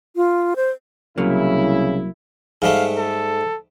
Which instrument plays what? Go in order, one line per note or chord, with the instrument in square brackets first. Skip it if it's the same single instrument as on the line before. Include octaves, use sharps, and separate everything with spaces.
[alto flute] F4
C5
[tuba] C2 [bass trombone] C#3 [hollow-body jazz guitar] F#3 A#3 [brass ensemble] E4
[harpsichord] G#2 G3 A3 [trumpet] F5
[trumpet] A4